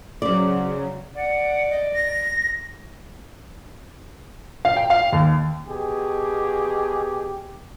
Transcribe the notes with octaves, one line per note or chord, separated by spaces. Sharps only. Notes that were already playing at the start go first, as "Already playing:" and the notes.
C#3 F#3 C5 D5
D5 F#5
D#5
A#6
F5
G5
F5
D#2
B2 G4 G#4